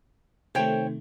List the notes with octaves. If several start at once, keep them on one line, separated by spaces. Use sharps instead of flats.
C3 D#3 A3 C5 C#5 G5